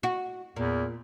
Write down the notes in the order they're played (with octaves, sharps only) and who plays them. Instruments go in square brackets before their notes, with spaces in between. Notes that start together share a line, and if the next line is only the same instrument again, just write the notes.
[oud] F#4
[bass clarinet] E2 [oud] A#2